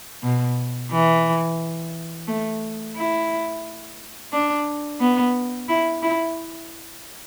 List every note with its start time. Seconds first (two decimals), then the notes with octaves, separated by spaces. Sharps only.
0.22 B2
0.91 E3
2.28 A3
2.96 E4
4.33 D4
5.00 B3
5.68 E4
6.02 E4